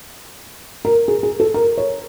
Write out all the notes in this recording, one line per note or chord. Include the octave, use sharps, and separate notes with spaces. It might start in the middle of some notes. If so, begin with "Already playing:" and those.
A#4
G#4
G#4
A4
A#4
C#5